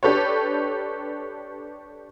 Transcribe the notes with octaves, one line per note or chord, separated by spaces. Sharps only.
D4 G4 A4 B4 C#5